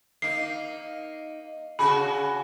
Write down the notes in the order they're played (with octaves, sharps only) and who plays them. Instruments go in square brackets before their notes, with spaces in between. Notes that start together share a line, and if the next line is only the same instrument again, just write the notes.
[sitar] A#3 D#4 [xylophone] C7
[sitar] C#3 F#4 G#4 [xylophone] B5